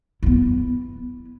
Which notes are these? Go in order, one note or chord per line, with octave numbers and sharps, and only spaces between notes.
B3 E4